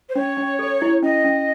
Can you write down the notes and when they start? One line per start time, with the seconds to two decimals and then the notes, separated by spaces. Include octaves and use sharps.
0.09 C5
0.16 C#4 C#5
0.37 C#4
0.59 A4
0.82 E4
1.03 C#4 D#5
1.25 C#4